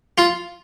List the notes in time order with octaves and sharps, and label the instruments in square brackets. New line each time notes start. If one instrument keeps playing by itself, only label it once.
[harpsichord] F4